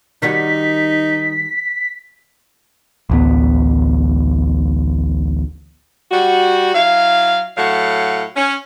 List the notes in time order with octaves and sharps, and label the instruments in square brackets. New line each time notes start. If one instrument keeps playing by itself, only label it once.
[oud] D#3 G3 F#4 [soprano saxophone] D#4 [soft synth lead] B6
[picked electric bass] A1 D2 B3
[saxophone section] G3 F#4
F#3 E4 F5
A2 F#3 A3 F5 F#5
C#4